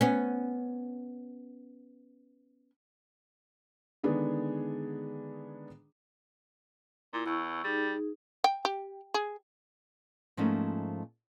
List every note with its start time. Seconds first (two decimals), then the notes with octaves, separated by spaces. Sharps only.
0.01 B3 C#4
4.03 D3 D#3 G#3 B3 D4 G#4
7.14 A#2 E4
7.26 E2 C#6 E6
7.64 G3 D#4 G#4
8.44 G5
8.65 G4
9.14 G#4
10.37 G#2 F3 A3 A#3 C#4 D#4